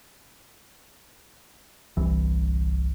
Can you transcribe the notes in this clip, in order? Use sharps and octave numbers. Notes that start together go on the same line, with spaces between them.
G1 C2 E3